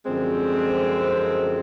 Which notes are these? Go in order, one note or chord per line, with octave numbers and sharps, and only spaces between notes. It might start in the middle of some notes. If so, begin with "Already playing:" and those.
F#2 D3 F3 G#3 C4